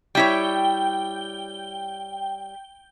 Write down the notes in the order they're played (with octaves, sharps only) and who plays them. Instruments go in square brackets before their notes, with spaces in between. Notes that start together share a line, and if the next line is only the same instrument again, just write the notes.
[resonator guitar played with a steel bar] G3 E4 C#5 [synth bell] G5